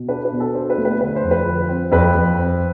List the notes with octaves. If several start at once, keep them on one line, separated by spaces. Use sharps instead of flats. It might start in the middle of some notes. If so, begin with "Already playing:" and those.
Already playing: B2
D4 B4
B4
B2
A4
D4 C5
B4
A3
B4
D3 B4
C5
F2
B4
F3
C4
F2 B4
F2
C4